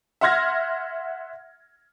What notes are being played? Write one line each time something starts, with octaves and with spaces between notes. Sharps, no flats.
E5 F#5 C6 F6 G#6 A#6